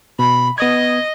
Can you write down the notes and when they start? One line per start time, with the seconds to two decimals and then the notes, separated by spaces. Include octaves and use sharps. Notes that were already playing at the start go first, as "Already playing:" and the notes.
0.19 B2 B5
0.58 B3 D#5 D#6 G#6